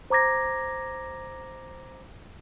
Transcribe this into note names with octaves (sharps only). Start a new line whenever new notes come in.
C5 A#5 D6 G#6 A#6